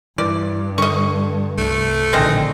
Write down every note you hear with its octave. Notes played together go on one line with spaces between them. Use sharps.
G2 E3 D5
D3 D#5 C#6
C2 A3
A#1 A2 D3 D#3 G#3 C4 D#5